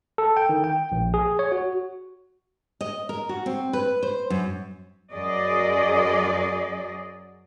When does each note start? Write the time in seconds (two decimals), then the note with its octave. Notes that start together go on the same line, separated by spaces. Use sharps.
0.18 A4
0.37 G5
0.49 D#3
0.64 G5
0.92 A#1
1.14 G#4
1.39 C#5
1.52 F#4
2.81 D#5
3.09 A#4
3.29 F#4
3.46 C4
3.73 B4
4.03 C5
4.30 F#2
5.12 F#2 F#3 G#4 D5 D#5